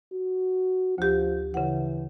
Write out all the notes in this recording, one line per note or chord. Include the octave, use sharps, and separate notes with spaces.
F#4
D2 F3 G4
C#3 E3 F#5